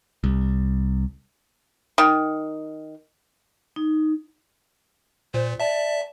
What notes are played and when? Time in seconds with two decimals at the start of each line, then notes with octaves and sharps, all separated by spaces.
0.24 C2
1.98 D#3
3.76 D#4
5.34 A#2 C5
5.60 D5 E5 A5